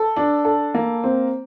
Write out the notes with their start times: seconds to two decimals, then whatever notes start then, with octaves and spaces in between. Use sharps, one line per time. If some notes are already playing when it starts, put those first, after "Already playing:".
Already playing: A4
0.16 D4
0.45 A4
0.74 A#3
1.04 C4